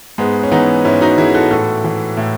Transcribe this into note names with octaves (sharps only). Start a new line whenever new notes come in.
G#2 G#3 B3
C#4
E3 B3 D#4
G#2 C#4 E4
D#4 F#4
E3 E4 G#4
F#4 A4
A2 F#4 A4
E3
A2